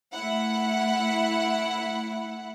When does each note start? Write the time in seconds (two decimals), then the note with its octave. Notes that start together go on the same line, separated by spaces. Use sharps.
0.14 A3 E4 F#5